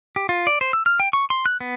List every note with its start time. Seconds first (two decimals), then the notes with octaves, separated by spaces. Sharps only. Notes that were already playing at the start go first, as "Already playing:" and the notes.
0.16 G4
0.29 F4
0.47 D5
0.61 C5
0.73 E6
0.86 F6
1.00 G5
1.13 C#6
1.30 C6
1.46 F#6
1.61 B3